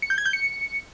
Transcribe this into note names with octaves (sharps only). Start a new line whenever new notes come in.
C#7
G6
G#6
G6
C#7